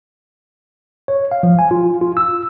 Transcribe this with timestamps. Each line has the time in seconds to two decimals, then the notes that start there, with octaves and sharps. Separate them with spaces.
1.08 C#5
1.31 F5
1.43 F3
1.59 G#5
1.71 F4
2.01 F4
2.17 E6